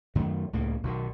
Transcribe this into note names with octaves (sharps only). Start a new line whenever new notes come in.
F#2 D#3 F#3 A3
C#2 A2 C#3 A#3
B1 B2 D#3